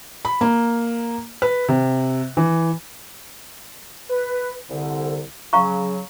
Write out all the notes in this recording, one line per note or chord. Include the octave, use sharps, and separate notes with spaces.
B5
A#3
B4
C3
E3
B4
C2 D3
C#3 F#3 F5 A#5 C#6